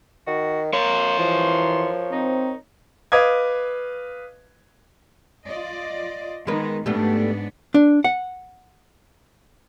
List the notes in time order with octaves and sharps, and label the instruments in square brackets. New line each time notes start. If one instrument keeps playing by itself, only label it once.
[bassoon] D#3 [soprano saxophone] F#4
[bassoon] A#3 [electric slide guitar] A#4 C#5 [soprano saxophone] C6
[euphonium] E3 [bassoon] F3
[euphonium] C4 [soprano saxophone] D#4
[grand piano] B4 D#5 F5 D6 D#6 G#6
[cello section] F4 D5 D#5
[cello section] D#3 B3 D#4 [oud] G#3 A#4 B4
[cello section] G#2 B3 D4 [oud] G3 A3 F#4
[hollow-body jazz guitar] D4
F#5